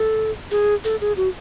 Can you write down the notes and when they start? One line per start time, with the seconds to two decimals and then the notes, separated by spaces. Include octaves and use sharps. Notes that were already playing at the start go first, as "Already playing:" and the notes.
Already playing: A4
0.51 G#4
0.84 A4
1.01 G#4
1.17 F#4